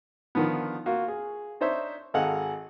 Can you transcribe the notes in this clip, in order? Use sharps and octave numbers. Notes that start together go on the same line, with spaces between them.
D3 D#3 F3 B3
A#3 F4 F#4
G#4
D4 D#4 C5 C#5 E5
G#1 G#4 A4 D#5 F5 F#5